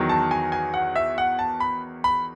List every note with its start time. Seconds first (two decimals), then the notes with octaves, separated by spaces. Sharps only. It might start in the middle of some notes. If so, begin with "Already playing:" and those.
Already playing: E2 D#3 F#3
0.09 A5
0.31 G#5
0.52 G#5
0.74 F#5
0.96 E5
1.18 F#5
1.39 A5
1.60 B5
2.04 B5